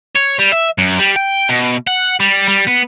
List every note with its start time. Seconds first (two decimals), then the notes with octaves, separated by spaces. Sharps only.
0.15 C#5
0.39 G3
0.52 E5
0.78 F#2
0.99 G3
1.16 G5
1.49 B2
1.87 F#5
2.20 G3
2.48 G3
2.67 B3